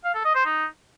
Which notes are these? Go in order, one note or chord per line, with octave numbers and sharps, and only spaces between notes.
F5
A4
D#5
C5
D#4